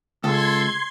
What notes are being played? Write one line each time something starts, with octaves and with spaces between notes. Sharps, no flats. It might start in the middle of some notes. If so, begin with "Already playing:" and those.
C#2 A4 C6 G#6